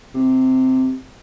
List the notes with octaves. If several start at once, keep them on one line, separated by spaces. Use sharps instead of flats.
C3